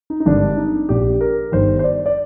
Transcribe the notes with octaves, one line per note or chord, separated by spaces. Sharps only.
D#4
D#4
G#1 G2 D3 D4
D#4
A#1 A#2 G4
A#4
G1 G2 D#3 C5
C5
D5
D5